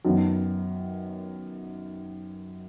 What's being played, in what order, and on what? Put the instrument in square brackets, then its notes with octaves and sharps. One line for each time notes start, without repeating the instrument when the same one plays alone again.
[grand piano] F#2 D#3 F#3 B3